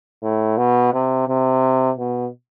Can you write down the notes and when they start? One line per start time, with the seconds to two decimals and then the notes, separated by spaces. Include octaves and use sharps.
0.23 A2
0.57 B2
0.93 C3
1.28 C3
1.98 B2